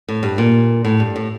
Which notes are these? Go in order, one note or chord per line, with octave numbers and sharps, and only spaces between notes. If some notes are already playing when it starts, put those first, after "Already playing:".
A2
G2
A#2
A2
G2
A2